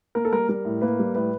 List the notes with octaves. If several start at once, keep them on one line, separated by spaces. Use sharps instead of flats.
A#3 A#4
A4
G3 A#4
G3 A#4
A2
A#3 B4
G3
A2 B4